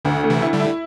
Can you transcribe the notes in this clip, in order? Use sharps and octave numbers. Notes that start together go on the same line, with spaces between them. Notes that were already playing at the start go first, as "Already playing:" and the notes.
D2 D3
A3
C3 E3
E4
D3 G3
E4